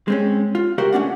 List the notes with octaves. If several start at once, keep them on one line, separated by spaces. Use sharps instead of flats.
G#3 C4 C#4
F4
C#2 F#4 G4 A#4 C5 F5
A3 C#4 D4 F#5